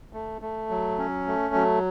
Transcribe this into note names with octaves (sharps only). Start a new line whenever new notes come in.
A3
A3
F#3
C#4
A3
F#3